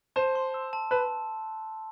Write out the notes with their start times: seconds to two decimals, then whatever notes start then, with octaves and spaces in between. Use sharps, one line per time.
0.16 C5 A5
0.35 C6
0.54 E6
0.73 A5
0.91 B4 A5